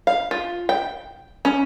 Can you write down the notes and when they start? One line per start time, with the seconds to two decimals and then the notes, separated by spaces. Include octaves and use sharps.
0.07 F5
0.31 F4
0.69 G5
1.45 C#4